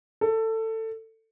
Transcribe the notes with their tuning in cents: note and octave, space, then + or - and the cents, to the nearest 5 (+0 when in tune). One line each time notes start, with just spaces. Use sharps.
A4 +20